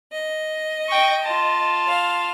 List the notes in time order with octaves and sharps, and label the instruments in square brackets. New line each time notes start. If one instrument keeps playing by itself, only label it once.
[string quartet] D#5
[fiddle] G5 C#6
F4 A5
[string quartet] F5